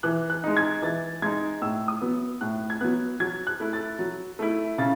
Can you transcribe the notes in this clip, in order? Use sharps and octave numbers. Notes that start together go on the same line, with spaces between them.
E3 F#6
F#6
G#3 D#4
G#6
E3 A6
G#3 D#4 G#6
A2 E6
D#6
F#3 B3
A2 F#6
G#6
F#3 B3 F#6
F#3 G#6
F#6
A3 E4
A6
F#3
A3 E4
C#3 A6